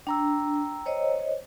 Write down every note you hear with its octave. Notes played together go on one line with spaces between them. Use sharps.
D4 G5 A#5 E6
C5 C#5 D#5